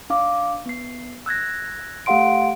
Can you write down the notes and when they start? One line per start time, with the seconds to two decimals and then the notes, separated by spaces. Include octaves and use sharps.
0.10 D4 F5 D6
0.66 B3 C7
1.26 E6 F#6 G#6 A#6
2.06 A3 G4 F5 F#5 C6 D7